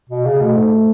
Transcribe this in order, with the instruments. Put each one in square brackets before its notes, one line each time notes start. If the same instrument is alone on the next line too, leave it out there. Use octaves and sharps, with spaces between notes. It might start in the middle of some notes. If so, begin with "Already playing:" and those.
[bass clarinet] B2
C#3
[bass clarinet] B2 [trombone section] A3
[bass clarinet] G#2